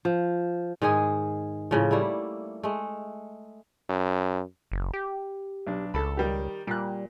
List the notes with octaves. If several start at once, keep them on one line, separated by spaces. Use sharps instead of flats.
F3
G#2 D#3 G#3 G#4
A2 C#3 F3
G3 A3 A#3 E4
G#3 A3
F#2
F#1
G4
B1 D4
C#2 A4 A5 B5
D#3 G3 G4
A#2 G3 F#6